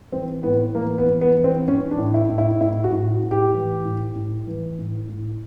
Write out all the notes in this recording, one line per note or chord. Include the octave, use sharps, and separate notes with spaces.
E3 C4
A2 B3
E3 A#3
B3
E3
B3
E3
C4
E3 C#4
D4
A2
E4
A2
E4
A2 E4
F#4
A2
A2
G4
E3
A2
A2
E3
A2
A2